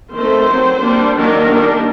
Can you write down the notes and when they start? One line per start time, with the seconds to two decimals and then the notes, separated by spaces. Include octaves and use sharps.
0.13 D#3 A3 C4 C5
0.47 F#3 C4
0.81 G3 A#3 D4
1.15 D#3 F#3 A#3 D4 A#4
1.49 D#3 G3 A#3 D4